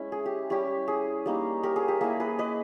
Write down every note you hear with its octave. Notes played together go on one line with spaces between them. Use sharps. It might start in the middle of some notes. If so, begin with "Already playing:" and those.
Already playing: G#3 C#4 E4
G#4
G4
G3 C#4 E4 G4
G#4
G3 A#3 D#4
G4 A#4
G#4
G4
A#3 E4 G#4
G#4 B4
B4 D#5